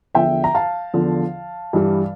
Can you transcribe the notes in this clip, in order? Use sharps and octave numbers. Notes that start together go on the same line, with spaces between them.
E2 D3 F3 E5 G5
A#5
F5 A5
E2 D3 F3
G2 E3 G3